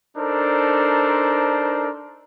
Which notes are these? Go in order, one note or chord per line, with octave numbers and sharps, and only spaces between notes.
D4 D#4 A4 A#4 C5